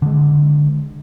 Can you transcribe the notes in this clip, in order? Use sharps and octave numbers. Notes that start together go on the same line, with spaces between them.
D3 G#3